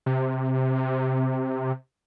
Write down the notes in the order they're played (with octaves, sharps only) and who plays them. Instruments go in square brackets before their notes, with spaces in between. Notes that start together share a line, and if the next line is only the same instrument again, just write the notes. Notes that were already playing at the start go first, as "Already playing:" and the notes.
[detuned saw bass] C3